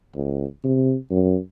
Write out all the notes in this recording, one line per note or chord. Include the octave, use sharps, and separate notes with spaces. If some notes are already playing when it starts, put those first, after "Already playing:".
C#2
C3
F#2